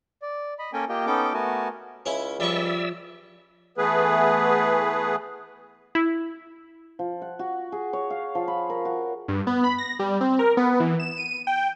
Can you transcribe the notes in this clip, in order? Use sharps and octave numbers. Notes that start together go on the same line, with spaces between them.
D5
D#5 B5
A#3 C#4 A4 A#4 G5 G#5
A#3 F4 G4 D#5 G5
B3 C#4 D#4 A4 G5 D6
A3 B3 F#4 A#4 G#5 A5
C#2 C#4 E4
F3 G3 D5 E5 C#6 E6
E3 A3 B3 G#4 B4
E4
F3
F#5
F#4
G#4
C#5
F5
F3
B5
A#4
F#4
G2
B3
B5
A#6
G3
C4
A#4
B3
E3
E7
D#7
G5